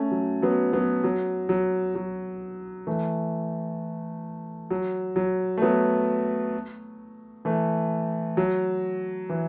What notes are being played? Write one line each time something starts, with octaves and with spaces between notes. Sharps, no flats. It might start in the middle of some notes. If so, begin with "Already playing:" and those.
Already playing: A3 C#4
F#3
F#3 B3
F#3 B3
F#3
F#3
F#3
E3 A3
F#3
F#3
A3
F#3 B3
E3 A3
F#3
E3